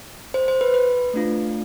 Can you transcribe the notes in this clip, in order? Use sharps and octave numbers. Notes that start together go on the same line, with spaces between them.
C5
C5
B4
B4
A3 D4 F4